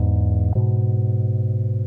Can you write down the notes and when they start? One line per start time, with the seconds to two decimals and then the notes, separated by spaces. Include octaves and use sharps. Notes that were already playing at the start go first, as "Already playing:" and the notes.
Already playing: E2 G#2
0.55 G#2 B2